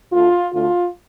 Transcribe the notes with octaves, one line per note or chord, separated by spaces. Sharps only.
D2 D3 A3 F4
D2 D3 A3 F4